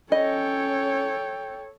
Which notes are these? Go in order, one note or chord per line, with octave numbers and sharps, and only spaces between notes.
C#4 A4 C#5 D#5 G5